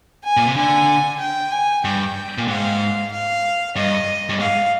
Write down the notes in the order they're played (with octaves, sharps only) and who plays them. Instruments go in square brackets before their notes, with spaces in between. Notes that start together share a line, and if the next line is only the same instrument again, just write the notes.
[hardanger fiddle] G#5
[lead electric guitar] A#2
C3
[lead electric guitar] D3 [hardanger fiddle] G#5
[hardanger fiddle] G5
G#5
[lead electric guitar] G2 [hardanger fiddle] G5
[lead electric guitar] A#2
[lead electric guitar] G#2 [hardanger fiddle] F5
[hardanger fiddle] F5
[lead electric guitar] G2 [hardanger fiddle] D#5
[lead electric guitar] G2
[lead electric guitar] G#2 [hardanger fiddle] F5